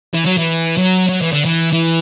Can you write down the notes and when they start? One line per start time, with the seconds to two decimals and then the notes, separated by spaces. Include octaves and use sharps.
0.14 E3
0.26 F#3
0.38 E3
0.78 F#3
1.09 F#3
1.22 E3
1.32 D3
1.45 E3
1.73 E3